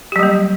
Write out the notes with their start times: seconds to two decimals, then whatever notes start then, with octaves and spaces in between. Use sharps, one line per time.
0.12 G4
0.16 F#3
0.19 G3
0.23 A#3